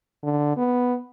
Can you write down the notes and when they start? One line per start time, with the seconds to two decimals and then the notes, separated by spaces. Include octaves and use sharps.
0.23 D3
0.57 B3